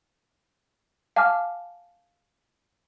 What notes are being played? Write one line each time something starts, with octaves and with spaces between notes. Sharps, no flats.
F5 G#5 A5 D6 F6